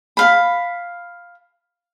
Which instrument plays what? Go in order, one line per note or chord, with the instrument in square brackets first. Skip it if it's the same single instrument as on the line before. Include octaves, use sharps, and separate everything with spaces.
[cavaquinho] F5 B5